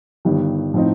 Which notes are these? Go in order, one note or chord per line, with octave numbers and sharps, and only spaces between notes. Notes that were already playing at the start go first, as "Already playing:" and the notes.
G1 G2 D#3
A2 F3 C4 D#4